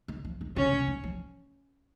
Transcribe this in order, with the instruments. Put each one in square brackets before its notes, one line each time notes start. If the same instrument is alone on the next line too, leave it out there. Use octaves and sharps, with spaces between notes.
[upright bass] D#3
F3
D#3
[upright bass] C#3 [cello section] C#4
[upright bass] C3
D#3
F3